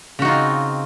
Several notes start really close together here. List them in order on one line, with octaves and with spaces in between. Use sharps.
C#3 F#4 D#4 F4 C4